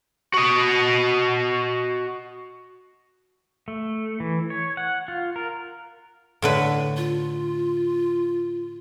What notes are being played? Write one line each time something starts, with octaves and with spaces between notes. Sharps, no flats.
F#4 D#5
A3
E3
C#5
F#5
F4
A#4
A2 D3 B4
F4